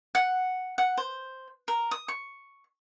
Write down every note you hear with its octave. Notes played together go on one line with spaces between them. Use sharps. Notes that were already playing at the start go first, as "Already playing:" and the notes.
F#5
F#5
C5
A#4
D#6
C#6